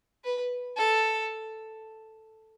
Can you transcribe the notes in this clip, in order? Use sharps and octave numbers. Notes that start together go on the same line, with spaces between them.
B4
A4